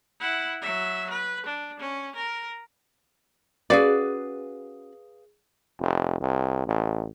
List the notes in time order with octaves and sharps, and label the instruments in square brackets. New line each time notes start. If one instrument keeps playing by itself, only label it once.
[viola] E4 F#5
F#3 E5
B4
D4
C#4
A#4
[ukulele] C#4 F#4 D5 [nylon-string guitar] G#4 B4 F5
[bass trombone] F1
C2
A1